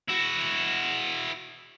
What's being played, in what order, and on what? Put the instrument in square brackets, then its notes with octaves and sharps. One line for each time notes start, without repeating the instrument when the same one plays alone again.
[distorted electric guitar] E4 F#4